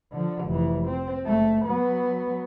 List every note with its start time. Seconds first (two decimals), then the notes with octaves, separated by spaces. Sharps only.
0.12 D3 F3
0.45 F1 E3
0.87 C4
1.26 F#1 A3
1.65 F#3 B3